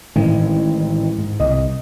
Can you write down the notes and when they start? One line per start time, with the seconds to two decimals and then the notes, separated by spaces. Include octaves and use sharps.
0.16 A1 D#3 G#3
1.18 G#2
1.40 C2 D#5